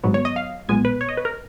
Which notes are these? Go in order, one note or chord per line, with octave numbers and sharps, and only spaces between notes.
G#1 G#2 F#3 B3
C#5
D#5
F5
B1 A#2 G#3 B3 G#5
B4
C#5
D#5
B4
A#4